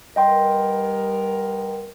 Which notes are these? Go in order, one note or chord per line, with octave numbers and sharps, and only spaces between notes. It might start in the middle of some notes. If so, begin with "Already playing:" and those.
G3 B3 A#4 D#5 G5 C6